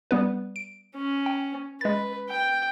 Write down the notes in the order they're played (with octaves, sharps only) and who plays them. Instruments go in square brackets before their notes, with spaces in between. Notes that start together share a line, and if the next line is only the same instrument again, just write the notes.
[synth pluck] G3 B3 B4
D7
[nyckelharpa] C#4
[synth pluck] G5
[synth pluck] G#3 A6 [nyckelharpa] B4
[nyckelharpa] G5